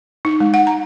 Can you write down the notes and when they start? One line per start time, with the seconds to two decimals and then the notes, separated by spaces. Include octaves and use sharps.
0.25 D#4
0.40 G#3
0.54 F#5
0.67 A#5